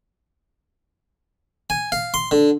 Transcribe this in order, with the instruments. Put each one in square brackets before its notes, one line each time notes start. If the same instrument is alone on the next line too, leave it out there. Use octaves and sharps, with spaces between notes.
[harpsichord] G#5
F5
C6
D3